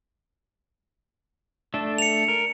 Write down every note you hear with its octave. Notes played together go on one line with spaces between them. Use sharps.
A3 D4 A4
C#7 F7
A#4